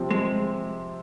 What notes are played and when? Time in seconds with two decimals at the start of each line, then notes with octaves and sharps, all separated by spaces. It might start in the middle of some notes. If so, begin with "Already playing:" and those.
Already playing: C3 F3 C4
0.11 G#3